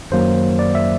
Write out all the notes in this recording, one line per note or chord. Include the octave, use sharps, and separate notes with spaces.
F#2 D#3 F#3 A#3 C5
D5
E5